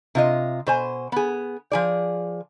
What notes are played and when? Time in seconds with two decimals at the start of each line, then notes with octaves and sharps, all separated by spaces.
0.15 C3 F4 D#5
0.67 B2 C5 G#5
1.12 B3 G#4
1.72 F3 G#4 D5